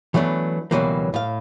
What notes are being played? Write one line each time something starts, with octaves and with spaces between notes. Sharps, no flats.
E3 F#3 A3 B3 D4
C#2 B2 E3 F#3 G3 A#3
A2 F5